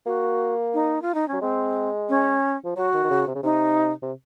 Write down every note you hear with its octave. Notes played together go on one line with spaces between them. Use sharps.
A#3 F#4
D#4
F4
D#4
C#4
F#3
G#3 C4
C#4
F3
F#3 F#4
D#3
D#3
C#3
C3
C#3
C3 D#4
C3